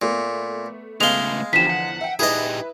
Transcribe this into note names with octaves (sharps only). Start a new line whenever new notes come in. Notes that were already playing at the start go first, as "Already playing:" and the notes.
A#2 A3 B3
C#3 G#3 A3 B3 F5 F7 G7
E2 D3 F3 D#4 G4 B6 E7
F#5
E5 G5
G3 D#4 E4 G#4 B4 D#5